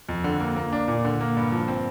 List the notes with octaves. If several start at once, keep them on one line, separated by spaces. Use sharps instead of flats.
F2
D3
A#3
A#3
D4
A#2
D3
A#3
G2
F3
C4